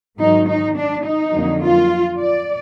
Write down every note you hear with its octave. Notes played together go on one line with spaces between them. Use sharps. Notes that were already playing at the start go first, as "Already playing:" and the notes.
G#2 D#3 F#3 D#4
D#4
D4
D#4
F2 D3 F#3 A#3
F4
D5